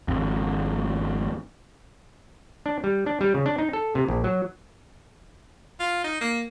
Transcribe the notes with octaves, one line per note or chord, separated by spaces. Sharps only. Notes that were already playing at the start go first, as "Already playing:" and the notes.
G#1 F2
D4
G3
D4
G3
C#3
D4
D#4
A4
C3
A#1
F#3
F4
D#4
A#3